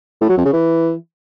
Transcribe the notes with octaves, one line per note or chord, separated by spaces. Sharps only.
A2
F#3
F2
C#3
E3